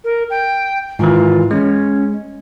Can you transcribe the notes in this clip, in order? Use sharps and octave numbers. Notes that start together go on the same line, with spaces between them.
A#4
G5
G#2 D#3 E3 F4
G#3 C#4